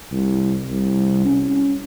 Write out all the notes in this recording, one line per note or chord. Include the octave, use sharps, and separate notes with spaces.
C2
C2
C#4